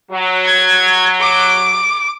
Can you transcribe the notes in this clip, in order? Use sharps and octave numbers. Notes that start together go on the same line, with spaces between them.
F#3
G#6
D6